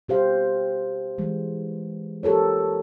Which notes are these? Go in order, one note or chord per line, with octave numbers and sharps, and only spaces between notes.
B2 G4 C5 F5
E3 G#3
G4 A4 A#4 C#5